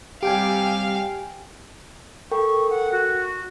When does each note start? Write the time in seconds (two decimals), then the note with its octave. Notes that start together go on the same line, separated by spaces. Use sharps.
0.23 C3 G3 G4 F5 G5 G#5
2.31 A4 A#4 G5 C#6
2.70 F#5
2.92 F#4